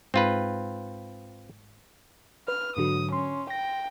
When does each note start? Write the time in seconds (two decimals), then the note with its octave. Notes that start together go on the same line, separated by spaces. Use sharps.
0.14 G#2 C4 F4 B4
2.48 B4 F6
2.77 G#2 D3 F#3 D#6
3.12 C#4 C6
3.50 G5 A#6